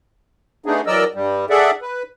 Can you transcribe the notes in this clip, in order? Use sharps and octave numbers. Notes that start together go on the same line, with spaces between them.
A3 B3 D4 D#4 G#4
E3 F#3 A#4 D5 D#5 E6
G2 G3
G#4 A4 D5 E5 F#5
B4